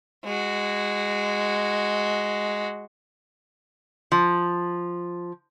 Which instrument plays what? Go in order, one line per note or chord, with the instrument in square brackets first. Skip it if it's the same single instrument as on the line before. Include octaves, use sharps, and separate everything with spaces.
[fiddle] G#3 F#4
[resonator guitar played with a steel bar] F3